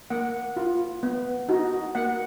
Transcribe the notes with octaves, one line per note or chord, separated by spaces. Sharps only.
A#3 F#5
F4
B3
D#4 F#4
A#3 F#5